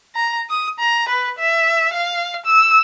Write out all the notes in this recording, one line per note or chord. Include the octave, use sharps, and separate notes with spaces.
A#5
D#6
A#5
B4
E5
F5
E6